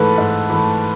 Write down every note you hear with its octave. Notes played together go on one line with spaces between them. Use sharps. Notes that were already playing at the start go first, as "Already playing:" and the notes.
Already playing: G#2 E3 A3 A4 B4
G#2
E3 A3